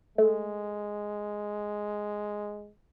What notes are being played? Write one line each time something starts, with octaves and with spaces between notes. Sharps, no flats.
G#3 A3